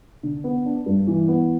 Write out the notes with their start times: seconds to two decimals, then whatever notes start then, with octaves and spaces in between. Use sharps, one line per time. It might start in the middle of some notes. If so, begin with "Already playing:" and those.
0.23 D3
0.44 B3
0.65 D4
0.86 G2
1.07 E3
1.28 B3